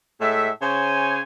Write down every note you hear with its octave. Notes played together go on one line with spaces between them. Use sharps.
A2 G#3 A3 E5
C#3 C5 C#5 G#5